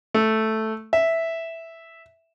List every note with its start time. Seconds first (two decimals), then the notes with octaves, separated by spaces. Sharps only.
0.14 A3
0.93 E5